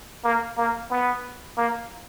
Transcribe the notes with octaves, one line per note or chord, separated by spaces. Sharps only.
A#3
A#3
B3
A#3